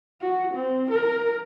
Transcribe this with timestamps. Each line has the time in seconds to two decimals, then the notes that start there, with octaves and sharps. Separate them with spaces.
0.22 F#4
0.54 C4
0.91 A#4